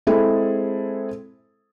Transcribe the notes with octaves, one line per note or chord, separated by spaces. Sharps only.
G#3 C4 E4 G#4 A4